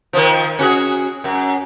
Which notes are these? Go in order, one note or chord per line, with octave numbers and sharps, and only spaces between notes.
D#3 F3
C#4 F#4 G#4
F#2